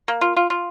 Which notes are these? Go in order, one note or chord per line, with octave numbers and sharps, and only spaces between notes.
A#3
F4
F4
F4